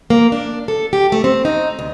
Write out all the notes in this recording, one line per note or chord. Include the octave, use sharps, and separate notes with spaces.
A#3
D4
A4
G4
A3
C4
D#4
D2